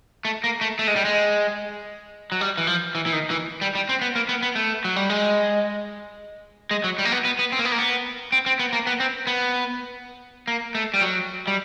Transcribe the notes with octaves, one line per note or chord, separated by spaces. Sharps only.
A3
A#3
A3
A3
G#3
G3
G#3
F#3
G3
E3
F3
E3
E3
D#3
E3
G3
G3
C4
B3
A#3
B3
B3
A3
F#3
G3
G#3
G#3
F#3
G3
A#3
B3
B3
B3
C4
A#3
B3
A#3
B3
C4
C4
B3
A#3
B3
C4
B3
A#3
A3
G3
F#3
G3